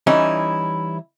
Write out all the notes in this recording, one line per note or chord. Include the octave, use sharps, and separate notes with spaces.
E3 G3 C#4 D#4 E4